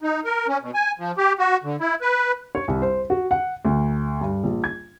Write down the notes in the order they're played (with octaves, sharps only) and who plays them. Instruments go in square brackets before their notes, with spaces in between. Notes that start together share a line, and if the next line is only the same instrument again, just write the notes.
[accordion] D#4
A#4
C#4
B2
G#5
F3
G4
F#4
D3
E4
B4
[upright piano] C#5
C2
C5
F#4
F#5
D2
G2
A#1
G#6